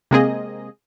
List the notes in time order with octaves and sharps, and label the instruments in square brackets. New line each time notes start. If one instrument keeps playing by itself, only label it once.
[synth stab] C3 G#3 A#3 C4 G#4 D#5